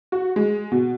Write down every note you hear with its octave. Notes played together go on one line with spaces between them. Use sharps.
F#4
G#3
B2